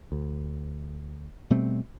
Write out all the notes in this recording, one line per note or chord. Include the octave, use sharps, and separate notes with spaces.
D2
B2 G3 A3 C4